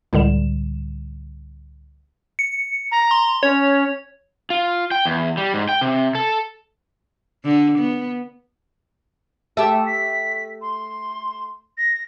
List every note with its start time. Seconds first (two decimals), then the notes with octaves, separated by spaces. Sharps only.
0.13 C#2 A2 D3 G3 E7
2.39 C#7
2.92 A#5
3.11 C6
3.43 C#4 C#5
4.50 F4
4.91 G5
5.06 E2
5.37 G3
5.54 G#2
5.69 G5
5.81 C3
6.15 A4
7.44 D3
7.78 B3
9.57 A3 G4 E5 A5
9.86 B6
10.61 C6
11.78 A#6